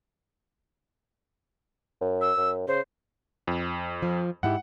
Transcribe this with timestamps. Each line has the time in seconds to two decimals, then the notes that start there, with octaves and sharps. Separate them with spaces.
2.01 F#2
2.21 E6
2.37 F#2
2.68 C#3 C5
3.48 F2
4.03 F3
4.43 G#2 E4 G4 F#5